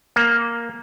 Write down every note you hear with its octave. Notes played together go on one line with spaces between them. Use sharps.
A#3